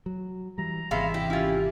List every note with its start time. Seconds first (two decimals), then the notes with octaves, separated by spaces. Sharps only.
0.06 F#3
0.58 E3 G3 A#5
0.91 G#1 C3 E3 G#3 B3 E5 F5
1.14 E4 G4
1.30 C#4 E4 F4